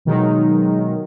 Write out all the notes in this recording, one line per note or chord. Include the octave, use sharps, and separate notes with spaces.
B2 D#3 F#3 G#3 D#4